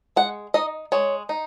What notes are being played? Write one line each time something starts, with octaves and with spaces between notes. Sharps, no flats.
G#3 F#5
D#4 D#5
G#3 C#5
D#4